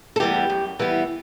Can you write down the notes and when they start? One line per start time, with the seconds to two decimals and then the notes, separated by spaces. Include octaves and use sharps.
0.16 A4
0.20 E3 G3 B3 G4
0.50 F#2
0.79 E3 G3 B3